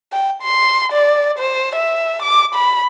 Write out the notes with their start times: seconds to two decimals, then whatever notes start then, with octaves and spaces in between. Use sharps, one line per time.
0.12 G5
0.42 C6
0.92 D5
1.39 C5
1.76 E5
2.23 D6
2.55 B5